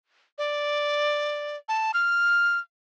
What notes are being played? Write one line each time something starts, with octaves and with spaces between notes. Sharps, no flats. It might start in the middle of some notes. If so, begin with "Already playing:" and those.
D5
A5
F6